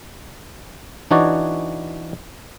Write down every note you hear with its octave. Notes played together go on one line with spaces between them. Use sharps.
E3 D4 D#4 F#4 C#5 D5